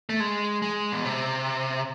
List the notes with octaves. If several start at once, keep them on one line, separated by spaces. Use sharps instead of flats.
A3
G#3
G#3
B2
C3